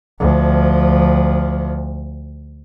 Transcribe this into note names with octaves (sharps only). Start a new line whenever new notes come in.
D2 F3